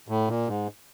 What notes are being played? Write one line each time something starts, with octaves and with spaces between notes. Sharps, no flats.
A2
A#2
G#2